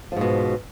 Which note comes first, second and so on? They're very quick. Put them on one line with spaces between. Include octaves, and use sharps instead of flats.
F3 G#2 B2